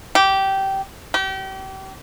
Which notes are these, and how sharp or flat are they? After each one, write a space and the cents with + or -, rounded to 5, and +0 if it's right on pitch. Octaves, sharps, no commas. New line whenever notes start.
G4 -15
G4 -35